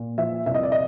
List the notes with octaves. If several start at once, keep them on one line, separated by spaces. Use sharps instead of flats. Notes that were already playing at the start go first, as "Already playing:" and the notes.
Already playing: A#2
F3 E5
C2 E5
D#5
D5
D#5